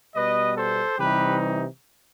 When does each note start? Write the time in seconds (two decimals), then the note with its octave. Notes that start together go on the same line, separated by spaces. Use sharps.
0.14 B2 G3 B3 B4 D#5
0.56 A4 C5
0.98 C3 E3 G3 D#4 G4 B4